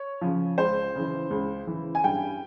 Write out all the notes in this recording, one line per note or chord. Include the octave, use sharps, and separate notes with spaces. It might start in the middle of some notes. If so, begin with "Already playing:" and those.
Already playing: C#5
C#3 F3
C#2 C5
C#3 E3
C#2
C#3 E3
G#5
G2 G5